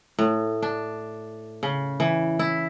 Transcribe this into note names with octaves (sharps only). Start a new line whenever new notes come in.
A2
D4
C#3
E3
E4